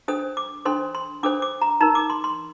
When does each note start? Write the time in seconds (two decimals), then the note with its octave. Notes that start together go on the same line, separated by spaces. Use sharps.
0.08 D4 A4 C5 D#6
0.37 D6
0.65 D4 A4 C5 C6
0.95 C6
1.23 D4 A4 C5 D6
1.42 D6
1.61 A#5
1.80 D#4 A#4 A#5
1.95 D6
2.10 C6
2.24 C6